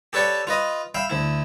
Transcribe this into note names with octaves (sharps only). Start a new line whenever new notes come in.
G4 A4 B4 C#5 D5 G5
F4 B4 D#5
E5 F5 G5 B5
D2 E4